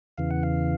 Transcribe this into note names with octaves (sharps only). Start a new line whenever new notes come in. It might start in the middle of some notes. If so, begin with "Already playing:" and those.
E2 C#3 E3 F5
F#5
F5